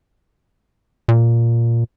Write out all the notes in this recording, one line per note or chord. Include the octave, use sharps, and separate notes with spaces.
A#2